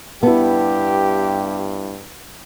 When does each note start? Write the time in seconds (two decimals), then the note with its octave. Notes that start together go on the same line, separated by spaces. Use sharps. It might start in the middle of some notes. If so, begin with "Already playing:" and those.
0.23 G2 B3 E4 G4 A5